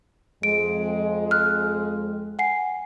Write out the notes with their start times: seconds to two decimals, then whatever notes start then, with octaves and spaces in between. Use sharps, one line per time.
0.43 F2 G#3 D7
1.31 F6 F#6
2.39 F#5 G#5 C7